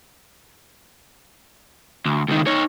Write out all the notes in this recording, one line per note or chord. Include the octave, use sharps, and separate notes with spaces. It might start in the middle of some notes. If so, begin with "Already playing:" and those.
D2
C#2 D#3
D#4 C#5